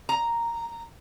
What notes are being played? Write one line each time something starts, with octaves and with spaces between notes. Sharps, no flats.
A#5